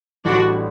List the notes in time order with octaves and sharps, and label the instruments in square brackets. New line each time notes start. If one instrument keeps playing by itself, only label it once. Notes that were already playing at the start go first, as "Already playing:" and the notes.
[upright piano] A1 A2 E3 G3 [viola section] D4 F#4